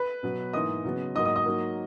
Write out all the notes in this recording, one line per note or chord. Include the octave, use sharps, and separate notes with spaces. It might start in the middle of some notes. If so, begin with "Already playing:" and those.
Already playing: B4 B5
B2 F#3 B3
G#2 E3 A#3 D#5 D#6
C#3 F#3 B3
G#2 F#3 A#3 D#5 D#6
D#5 D#6
D#5 D#6
G#2 F#3 A#3